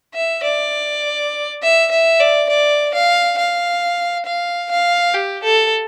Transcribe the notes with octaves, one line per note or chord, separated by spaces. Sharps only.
E5
D5
E5
E5
D5
D5
F5
F5
F5
F5
G4
A4